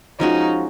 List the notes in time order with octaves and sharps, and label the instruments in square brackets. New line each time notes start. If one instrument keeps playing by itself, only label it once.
[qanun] F3 G#3 C#4 F#4 [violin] D#4